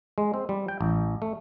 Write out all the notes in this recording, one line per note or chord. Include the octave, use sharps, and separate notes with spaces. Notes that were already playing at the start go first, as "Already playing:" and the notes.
G#3
C4
G3
G5
A1
A3